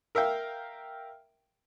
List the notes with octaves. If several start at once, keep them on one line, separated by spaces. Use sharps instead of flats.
A#4 E5 F5 G5